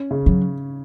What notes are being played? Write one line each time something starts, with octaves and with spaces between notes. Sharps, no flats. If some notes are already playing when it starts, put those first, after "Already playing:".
Already playing: C#4
C#3
F#3